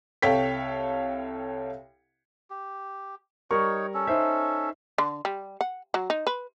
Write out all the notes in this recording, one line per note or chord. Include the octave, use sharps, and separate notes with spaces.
C2 A4 C#5 F5 G5 B6
G4
G3 D#4 A#4 C#5 C#6
C#4 A4
D#4 C5 E5
D3
G3
F#5
F#3
D#4
B4